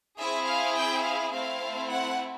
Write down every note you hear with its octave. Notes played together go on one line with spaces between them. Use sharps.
C4 E4 G#4 E5
F5
G5
F5
A3 C4 E4 F5
F#5